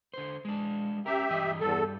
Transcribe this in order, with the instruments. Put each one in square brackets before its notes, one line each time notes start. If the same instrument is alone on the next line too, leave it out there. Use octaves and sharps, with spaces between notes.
[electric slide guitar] D3 C5
G#3 D4
[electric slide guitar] C#4 A#4 [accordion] G4 E5
[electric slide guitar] G2 E3 D#5
[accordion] E2 A4 [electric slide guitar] G2 G3